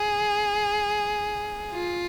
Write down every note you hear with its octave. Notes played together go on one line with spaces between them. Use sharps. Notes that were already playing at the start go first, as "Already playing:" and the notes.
Already playing: G#4
F4